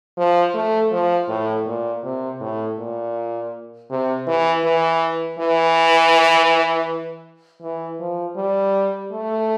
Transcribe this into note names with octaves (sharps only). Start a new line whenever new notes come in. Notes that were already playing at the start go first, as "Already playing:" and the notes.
F3
A3
F3
A2
A#2
C3
A2
A#2
C3
E3
E3
E3
E3
F3
G3
A3